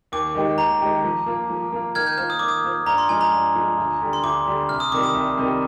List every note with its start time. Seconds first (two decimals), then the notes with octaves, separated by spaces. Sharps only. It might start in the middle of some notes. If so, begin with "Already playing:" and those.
0.12 D#2 D6
0.35 D#3 G#3 D#4 G4
0.58 D#2 A#5
0.81 D#3 G#3 D#4 G4
1.04 F3
1.26 A#3 F4
1.50 F3
1.72 A#3 F4
1.95 D#3 F6 G#6
2.06 G6
2.17 A#3 F4 C5 F6
2.30 D#6
2.39 D#3 D6
2.48 D#6
2.64 A#3 F4 C5
2.86 G2 A#5
2.98 C6
3.09 F3 G#3 G#5
3.21 A#5
3.33 G2
3.55 F3 G#3
3.77 D2
4.01 D3 G3
4.13 C6
4.24 D2 D6
4.46 D3 G3
4.69 C2 F6
4.80 D#6
4.92 C3 D#3 G3 D6
5.03 D#6
5.15 C2
5.37 C3 D#3 G3